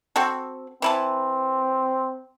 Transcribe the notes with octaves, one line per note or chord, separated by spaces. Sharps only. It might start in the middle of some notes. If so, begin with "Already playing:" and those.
C4 F#4 A4
E3 C4 E4 A5